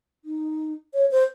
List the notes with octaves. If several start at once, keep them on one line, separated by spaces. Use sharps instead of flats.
D#4
C#5
C5